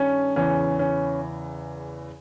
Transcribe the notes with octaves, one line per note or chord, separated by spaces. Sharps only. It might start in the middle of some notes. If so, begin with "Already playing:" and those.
Already playing: G2 D#3 C#4
E2 C#3 E3 C#4
C#4